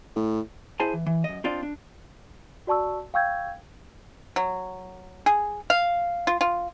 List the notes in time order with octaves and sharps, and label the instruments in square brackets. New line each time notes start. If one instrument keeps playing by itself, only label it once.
[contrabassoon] A2
[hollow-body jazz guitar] E4 G#4 C5 G#5 A5
E3
E3
F#2 D#5
C4 D4 F4 D5 D#5
D4
[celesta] F#4 D5 A5 C#6 E6
F5 G5 C#6 E6 G6 G#6
[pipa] F#3
G#4
F5
F4
F4